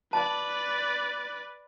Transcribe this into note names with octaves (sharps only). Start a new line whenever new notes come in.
B4 D5 A5